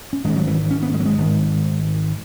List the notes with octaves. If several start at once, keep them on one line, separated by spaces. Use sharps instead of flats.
C#4
G#1 G#2 G#3
F#3
E3
C#4
B3
G#3
F#3
G#3
G#1 G#2